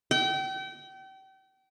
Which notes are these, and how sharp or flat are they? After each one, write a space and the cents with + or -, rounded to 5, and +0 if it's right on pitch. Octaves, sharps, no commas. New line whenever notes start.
G5 -35